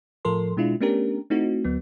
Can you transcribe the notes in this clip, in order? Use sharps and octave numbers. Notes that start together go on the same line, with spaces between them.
A2 F3 A4 A#4 C6
B2 G#3 D4 E4 F4
A3 B3 C#4 D4 G4 A#4
A3 C4 D#4 E4 F#4
D2 F#3 B3